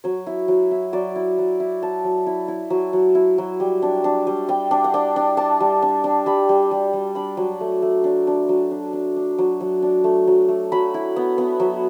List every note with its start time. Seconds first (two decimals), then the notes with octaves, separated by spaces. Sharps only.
0.04 F#3 C#5
0.27 E4
0.48 F#3
0.71 E4
0.93 F#3 D5
1.16 E4
1.38 F#3
1.60 E4
1.82 F#3 A5
2.04 F#3
2.27 E4
2.48 E4
2.70 F#3
2.93 F#3
3.15 E4
3.38 F#3
3.60 G3
3.82 D4
4.04 D4
4.27 G3
4.49 G3 G5
4.71 D4
4.84 F#5
4.94 D4 G5
5.16 D4
5.37 D4 A5
5.60 G3
5.82 D4
6.04 D4
6.26 G3 B5
6.49 G3
6.71 G3
6.93 G3
7.15 D4 B5
7.37 F#3
7.61 A3
7.82 A3
8.04 D4
8.27 D4
8.49 F#3
8.71 D4
8.93 D4
9.16 D4
9.38 F#3
9.61 F#3
9.82 D4
10.04 A3
10.27 F#3
10.49 A3
10.72 F#3 B5
10.94 E4
11.16 B3
11.38 B3
11.60 F#3